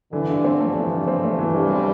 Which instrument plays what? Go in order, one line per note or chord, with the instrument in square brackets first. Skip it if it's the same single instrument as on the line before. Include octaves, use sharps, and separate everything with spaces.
[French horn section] D3 [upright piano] E3
[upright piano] G2
C4
[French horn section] F3 [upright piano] A3
[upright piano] E3
G2
C4
A3
E3
[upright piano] G2 [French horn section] G3
[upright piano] C4